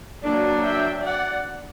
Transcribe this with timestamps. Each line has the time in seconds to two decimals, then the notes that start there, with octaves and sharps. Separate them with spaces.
0.22 F#3 A#3 D4
0.63 E5 G5
1.03 D5 F#5